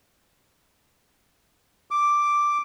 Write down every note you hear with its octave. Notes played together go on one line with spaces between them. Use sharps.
D6